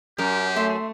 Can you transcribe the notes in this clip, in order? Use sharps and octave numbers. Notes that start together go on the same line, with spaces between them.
F#2 G4 A#4
A3 E5 C6